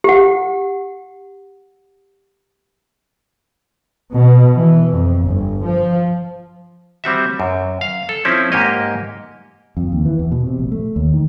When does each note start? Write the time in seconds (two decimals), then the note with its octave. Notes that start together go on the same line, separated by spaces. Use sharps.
0.04 G4 F#5
4.11 B2
4.57 E3
4.93 F2
5.25 G1
5.66 F3
7.04 G3 C4 F#4 E5
7.40 F#2
7.81 F5
8.09 A4
8.25 F3 C4 C#4 E4
8.52 G#2 A#3 G4 C#5 D#5
9.77 F2
9.92 D#2
10.05 E3
10.19 E2
10.32 B2
10.47 C3
10.59 A#1
10.72 A3
10.96 D#2
11.14 D#3